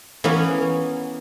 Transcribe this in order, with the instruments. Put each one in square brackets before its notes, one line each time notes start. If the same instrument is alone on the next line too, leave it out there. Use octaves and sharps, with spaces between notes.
[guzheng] E3 A#3 B3 C#4